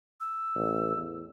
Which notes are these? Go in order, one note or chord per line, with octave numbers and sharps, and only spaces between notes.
E6
A1
E2